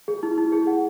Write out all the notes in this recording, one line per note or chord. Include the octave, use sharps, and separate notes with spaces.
G#4
E4
E4
G#4
F#5